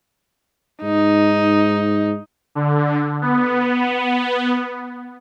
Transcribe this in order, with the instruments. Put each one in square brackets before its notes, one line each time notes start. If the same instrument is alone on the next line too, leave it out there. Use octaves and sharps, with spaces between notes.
[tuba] G#2 [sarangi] D#4
[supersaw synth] D3
B3